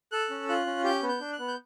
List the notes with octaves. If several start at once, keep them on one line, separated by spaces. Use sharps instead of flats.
A4 F#6
C#4
F4 F#6
C#4
G4 G6
B3
G6
D4
F#6
B3
G6